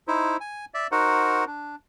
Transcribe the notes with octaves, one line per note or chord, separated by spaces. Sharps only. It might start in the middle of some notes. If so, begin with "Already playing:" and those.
D#4 E4 C5
G#5
D5 E5
D#4 F#4 A#4 C5 F#5
D4